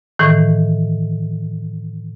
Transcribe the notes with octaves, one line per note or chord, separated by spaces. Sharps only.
A2 D#3 E3